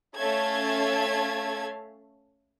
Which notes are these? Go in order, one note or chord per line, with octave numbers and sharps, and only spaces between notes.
A3 C#4 A4 E5 F5 G#6